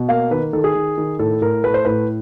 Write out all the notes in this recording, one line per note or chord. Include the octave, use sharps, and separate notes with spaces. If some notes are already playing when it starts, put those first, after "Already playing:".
Already playing: B2
A#3 F5
D#3 B4
D#3 A4
G#4
D#3
D#3
A2 A4
A2 A#4
A3 B4
C5
A2 B4